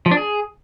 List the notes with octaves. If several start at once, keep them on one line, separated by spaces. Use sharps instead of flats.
F3
D4
G#4